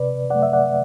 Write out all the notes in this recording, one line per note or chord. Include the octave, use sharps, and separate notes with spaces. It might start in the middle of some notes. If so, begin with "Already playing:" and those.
Already playing: C3 B4 D5
F#3 A3 D5 F#5
E5
D5 F#5